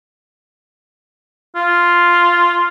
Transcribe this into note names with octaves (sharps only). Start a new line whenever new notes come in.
F4